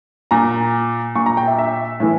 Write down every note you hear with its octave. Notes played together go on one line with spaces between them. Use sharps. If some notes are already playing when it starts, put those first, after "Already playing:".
A#2 A#5
A#2 C#6
A#5
G5
E5
E5
A2 E3